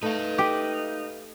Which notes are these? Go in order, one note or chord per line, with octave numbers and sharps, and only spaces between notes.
A3 D#4 B4 F5
G4